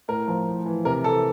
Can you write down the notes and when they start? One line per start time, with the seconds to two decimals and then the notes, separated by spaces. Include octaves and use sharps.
0.08 A2 A#4
0.28 F3
0.47 A2
0.65 E3
0.85 C3 A#4
1.04 E3 A4